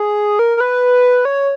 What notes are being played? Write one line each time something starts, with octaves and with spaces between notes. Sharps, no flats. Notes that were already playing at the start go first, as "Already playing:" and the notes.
Already playing: G#4
A#4
A#4
B4
C#5